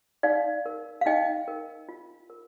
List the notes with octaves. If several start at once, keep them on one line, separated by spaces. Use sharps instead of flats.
D#4 D5 F5
A#4
F5
D#4 D#5 G5
A#4
F4
A#4